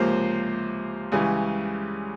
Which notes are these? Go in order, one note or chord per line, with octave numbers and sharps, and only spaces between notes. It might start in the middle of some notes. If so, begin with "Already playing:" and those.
Already playing: C#2 C3 F3 A#3 C5
C#2 C#3 E3 G3